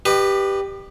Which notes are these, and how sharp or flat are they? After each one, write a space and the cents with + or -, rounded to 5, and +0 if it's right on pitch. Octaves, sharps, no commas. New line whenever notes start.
G4 +0 B4 +0 D#5 -40